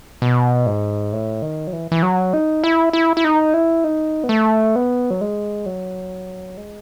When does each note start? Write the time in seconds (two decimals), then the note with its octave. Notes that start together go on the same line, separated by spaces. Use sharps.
0.22 B2
0.66 G#2
1.13 A2
1.42 D#3
1.67 F#3
1.73 E3
1.92 E3
2.03 F#3
2.33 D#4
2.64 E4
2.93 E4
3.17 E4
3.24 D#4
3.54 E4
3.84 D#4
4.24 B3
4.29 A3
4.76 B3
5.10 F#3
5.21 G#3
5.66 F#3
6.57 G#3